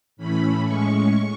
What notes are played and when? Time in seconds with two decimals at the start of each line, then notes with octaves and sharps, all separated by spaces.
0.17 A2 E3 A3 C#4 B5
0.66 A2 G#3 C#4 C#6